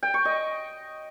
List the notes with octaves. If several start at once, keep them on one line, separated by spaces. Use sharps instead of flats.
G5
C#6
D#5